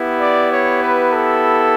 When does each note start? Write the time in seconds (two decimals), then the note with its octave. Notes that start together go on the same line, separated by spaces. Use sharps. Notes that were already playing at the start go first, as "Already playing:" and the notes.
Already playing: B3 E4 G4
0.21 D5
0.52 C#5
0.82 B4
1.12 A4